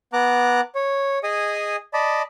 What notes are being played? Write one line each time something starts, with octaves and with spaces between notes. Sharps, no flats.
B3 A#5 D6 F#6
C#5
G#4 D#5 G#5 D#6
D5 D#5 A5 B5